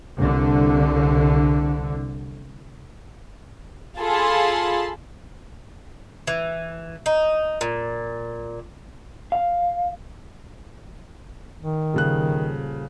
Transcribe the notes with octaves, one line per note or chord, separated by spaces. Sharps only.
C2 D3
F4 G#4 A4 A5 B5 C6
E3
D#4
A#2
F5
D#3
D#1 C#3 F#6